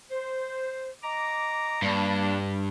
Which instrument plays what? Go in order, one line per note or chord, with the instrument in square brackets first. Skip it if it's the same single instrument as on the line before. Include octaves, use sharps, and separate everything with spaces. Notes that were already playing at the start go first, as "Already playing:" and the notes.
[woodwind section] C5
D#5 A#5 D6
[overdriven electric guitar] G2 [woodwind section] G3 A#3 D4